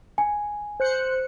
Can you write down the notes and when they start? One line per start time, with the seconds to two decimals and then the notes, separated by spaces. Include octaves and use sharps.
0.18 G#5
0.80 C5 F#6 C#7